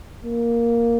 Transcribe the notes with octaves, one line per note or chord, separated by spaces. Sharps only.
A#3